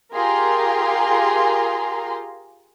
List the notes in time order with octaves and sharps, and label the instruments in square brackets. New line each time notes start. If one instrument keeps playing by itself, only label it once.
[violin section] F4 G4 G#4 A#4 A#5 C6